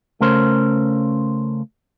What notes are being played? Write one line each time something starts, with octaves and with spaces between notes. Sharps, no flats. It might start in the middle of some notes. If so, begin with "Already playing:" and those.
C#3 A3 C#4 A#4 C5